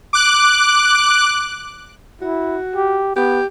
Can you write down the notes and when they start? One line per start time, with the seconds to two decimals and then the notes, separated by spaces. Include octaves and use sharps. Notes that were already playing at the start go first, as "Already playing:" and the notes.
0.13 D6 F#6
2.22 E4 F#4
2.76 G4
3.16 B3 G4